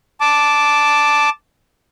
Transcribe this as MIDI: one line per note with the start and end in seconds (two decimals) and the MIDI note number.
0.20 1.29 81
0.20 1.29 86